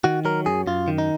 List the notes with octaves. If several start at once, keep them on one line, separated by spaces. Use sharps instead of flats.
D#3 F#4
F#3 A#4
F#2 G#4
F#2 F4
D#3
D#4